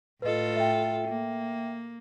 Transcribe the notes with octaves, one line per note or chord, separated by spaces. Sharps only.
A2 F4 A4 B4 D#5
E5 G5
A#3